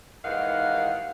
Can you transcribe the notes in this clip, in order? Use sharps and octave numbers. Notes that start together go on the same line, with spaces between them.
D#2 G#2 D#3 E3 F5 F#5